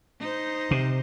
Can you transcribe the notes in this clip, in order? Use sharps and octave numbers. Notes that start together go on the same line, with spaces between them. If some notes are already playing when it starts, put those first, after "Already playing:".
D#4 C5
C3